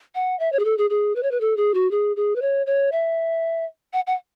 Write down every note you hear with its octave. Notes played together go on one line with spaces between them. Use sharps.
F#5
E5
C#5
G#4
A4
G#4
G#4
B4
C#5
B4
A4
G#4
F#4
G#4
G#4
B4
C#5
C#5
E5
F#5
F#5